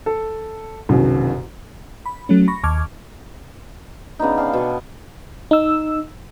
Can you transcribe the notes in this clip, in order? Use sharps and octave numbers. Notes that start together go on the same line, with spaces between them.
A4
F#1 C2 F#2 B2 D#3
B5
F#3 A3 C#4
B5 C#6 A#6
D#2 A5 C#6 D6 F6 G#6
C#3 B3 D4 D#4
D5 F5 G5 A5
B2 C#6
D#4 E6